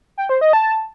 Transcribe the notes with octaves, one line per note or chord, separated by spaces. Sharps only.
G5
C5
D#5
A5